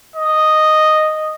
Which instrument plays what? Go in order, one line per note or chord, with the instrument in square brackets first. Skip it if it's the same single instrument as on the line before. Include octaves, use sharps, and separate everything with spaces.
[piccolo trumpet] D#5